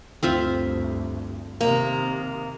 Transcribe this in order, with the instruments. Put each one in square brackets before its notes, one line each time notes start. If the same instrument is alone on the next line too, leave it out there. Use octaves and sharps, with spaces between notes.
[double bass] D2 G2 [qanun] C4 F4 E5
[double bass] C3 D#3 [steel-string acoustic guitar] A#3